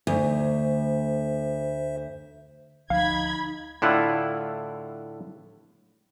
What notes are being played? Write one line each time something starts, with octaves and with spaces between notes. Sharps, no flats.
D2 C5 E5
D2 F3 D#4 F5 B5 G#6
A2 D3 E4 F4 F#5